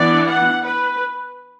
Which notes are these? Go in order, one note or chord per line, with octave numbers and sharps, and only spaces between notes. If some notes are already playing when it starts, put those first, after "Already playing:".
Already playing: E3 B3 D4 D5
F#5
B4